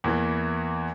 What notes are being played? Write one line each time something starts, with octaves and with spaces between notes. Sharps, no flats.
E2 E3 A#3